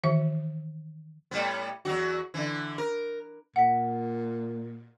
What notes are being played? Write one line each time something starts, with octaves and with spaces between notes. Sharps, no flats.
D#3 E3 E5
A2 G3 B3
E2 F#3 F#4
D3 E3
A#4
A#2 F#5 B6